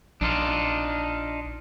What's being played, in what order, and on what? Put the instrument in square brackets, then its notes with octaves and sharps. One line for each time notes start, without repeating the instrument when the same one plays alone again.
[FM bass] A#1 [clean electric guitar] D4 D#4 F4